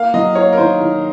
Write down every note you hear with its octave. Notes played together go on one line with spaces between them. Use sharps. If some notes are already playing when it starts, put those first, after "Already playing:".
Already playing: A#3 F5
F#3 D#5
A#3 C#5
A#4
D#3 C5
D#3